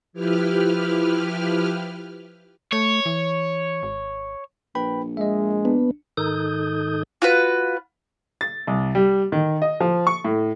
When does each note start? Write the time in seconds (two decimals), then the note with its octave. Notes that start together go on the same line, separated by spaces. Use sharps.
0.13 F3 E4 G4 B4 F6
2.72 A3 C#5
3.06 E3
3.83 G#1
4.75 A#1 B4 G5 B5
5.17 G#3 D#5 E5
5.65 B3 D4
6.17 G#2 D#3 D#4 A4 D#6 G6
7.22 F4 F#4 B4
8.41 A6
8.67 C2
8.95 G3
9.32 D#3
9.62 D#5
9.80 F3
10.07 C#6
10.25 A2